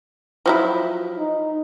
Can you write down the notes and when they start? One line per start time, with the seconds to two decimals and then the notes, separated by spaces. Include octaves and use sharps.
0.46 F3 F#3 E4
1.19 D#4